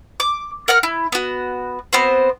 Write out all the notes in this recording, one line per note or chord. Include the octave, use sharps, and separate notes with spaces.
D6
A#4 F#5 F6
E4
B3 F#4
B3 C4 F#4 C5